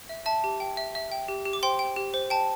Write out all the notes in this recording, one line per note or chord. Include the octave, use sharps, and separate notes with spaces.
E5
E5 A5
G4
G5
E5
E5
G5
G4
G4
D6
C5 G5 C6
G5
G4
C5
G5 A5